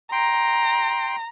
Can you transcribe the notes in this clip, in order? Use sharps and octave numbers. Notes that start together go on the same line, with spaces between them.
G5 A#5 C6